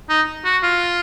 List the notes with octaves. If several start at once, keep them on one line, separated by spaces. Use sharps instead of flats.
D#4
F#4
F4